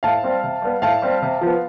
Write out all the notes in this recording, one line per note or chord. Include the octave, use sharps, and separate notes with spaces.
A2 F5 A5
G3 C4
C3
G3 B3
A2 F5 A5
G3 C4
C3
F3 B3